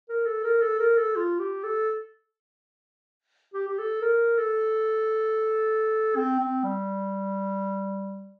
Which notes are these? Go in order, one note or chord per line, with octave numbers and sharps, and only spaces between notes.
A#4
A4
A#4
A4
A#4
A4
F4
G4
A4
G4
G4
A4
A#4
A4
C4
C4
G3